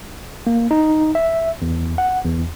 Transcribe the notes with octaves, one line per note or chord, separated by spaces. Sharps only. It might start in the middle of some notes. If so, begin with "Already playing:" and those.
A#3
D#4
E5
E2
F#5
E2